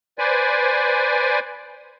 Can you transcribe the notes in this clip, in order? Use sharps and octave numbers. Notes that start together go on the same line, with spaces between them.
B4 C5 D5 G#5